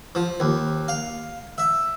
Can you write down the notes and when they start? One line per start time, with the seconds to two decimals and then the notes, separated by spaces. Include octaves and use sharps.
0.15 F3
0.40 D#2
0.88 F5
1.58 E5